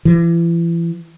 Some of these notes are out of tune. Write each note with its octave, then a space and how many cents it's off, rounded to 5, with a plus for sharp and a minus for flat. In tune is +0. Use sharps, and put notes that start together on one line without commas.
E3 +35